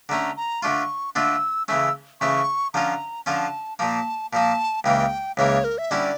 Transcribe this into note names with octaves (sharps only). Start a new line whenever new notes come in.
D3 A3 C#4 A#5
A#5
D3 A3 D4 F4 C#6
D3 A3 D4 F4 E6
C#3 E3 A3 C#4 E6
C#3 E3 A3 C#4 C#6
D3 F3 C#4 F4 A#5
D3 F3 C#4 F4 A5
A#2 F3 A#3 A5
A#2 F3 A#3 A5
C#2 C#3 E3 A#3 G5
C#2 C#3 E3 A#3 C#5
A#4
E5
D3 G3 C#4 E4 D5